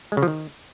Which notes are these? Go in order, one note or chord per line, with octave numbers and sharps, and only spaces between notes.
G#3
C#3
F3
D#3